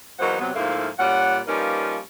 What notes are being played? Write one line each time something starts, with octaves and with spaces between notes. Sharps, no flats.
E2 F#3 A#3 D#4 C5 F#5
C3 F#3 B3
G#2 F3 A3 A#3 E4 F5
A#2 G3 C#4 F#5
F3 G3 A#3 C#4 D#4 B4